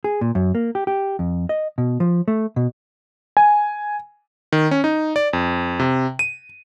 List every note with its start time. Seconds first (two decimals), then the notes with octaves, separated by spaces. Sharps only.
0.04 G#4
0.21 A#2
0.35 F#2
0.55 A#3
0.75 G4
0.87 G4
1.19 F2
1.49 D#5
1.78 B2
2.00 F3
2.28 A3
2.56 B2
3.37 G#5
4.52 D#3
4.71 C#4
4.84 D#4
5.16 D5
5.33 F2
5.79 C3
6.19 D#7